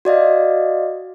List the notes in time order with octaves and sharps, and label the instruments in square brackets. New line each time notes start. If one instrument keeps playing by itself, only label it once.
[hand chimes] F#4 D5 D#5 F5